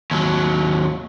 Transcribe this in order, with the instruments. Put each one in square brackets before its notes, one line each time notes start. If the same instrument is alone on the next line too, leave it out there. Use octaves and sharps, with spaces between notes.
[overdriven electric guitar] D#2 F#3